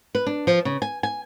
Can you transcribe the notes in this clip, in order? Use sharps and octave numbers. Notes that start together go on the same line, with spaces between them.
B4
D4
F3
C#3
G#5
G#5